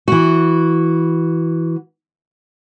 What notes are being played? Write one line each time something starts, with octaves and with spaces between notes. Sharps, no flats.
E3 F#4